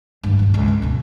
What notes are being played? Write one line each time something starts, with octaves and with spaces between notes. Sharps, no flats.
G2 D#3
G2 A#2
C#2
C#3
D2 B2